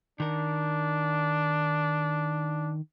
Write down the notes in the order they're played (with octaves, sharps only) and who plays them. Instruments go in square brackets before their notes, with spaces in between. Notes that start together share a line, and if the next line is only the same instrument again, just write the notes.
[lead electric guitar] D#3 A#4 [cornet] D4